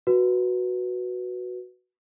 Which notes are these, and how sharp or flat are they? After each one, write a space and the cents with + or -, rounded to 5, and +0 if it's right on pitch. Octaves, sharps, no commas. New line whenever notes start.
F#4 -5 B4 -10